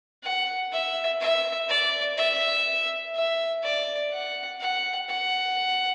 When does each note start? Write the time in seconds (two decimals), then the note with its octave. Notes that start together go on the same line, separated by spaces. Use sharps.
0.23 F#5
0.72 E5
1.20 E5
1.69 D5
2.17 E5
3.15 E5
3.63 D5
4.12 F#5
4.61 F#5
5.09 F#5